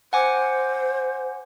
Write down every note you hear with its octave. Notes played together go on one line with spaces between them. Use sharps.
C5 F#5 G#5 D6